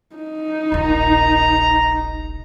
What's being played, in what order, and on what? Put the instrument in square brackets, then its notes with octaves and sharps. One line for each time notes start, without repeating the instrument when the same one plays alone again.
[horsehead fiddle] D#4
[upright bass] D#1 A#1 [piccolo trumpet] A#5